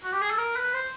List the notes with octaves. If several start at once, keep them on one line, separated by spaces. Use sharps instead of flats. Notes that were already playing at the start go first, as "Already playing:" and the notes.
F#4
G4
G#4
A4
A#4
B4
C5